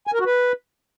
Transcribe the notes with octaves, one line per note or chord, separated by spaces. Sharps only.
G#5
A#4
F#4
B4